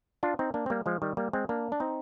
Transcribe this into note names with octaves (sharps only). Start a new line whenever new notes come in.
D4 F4
C4 D#4
A#3 D4
C4
G3 A#3
F3 G#3
D#3 G3
G3 A#3
G#3 C4
A#3 D4
D4
C4 D#4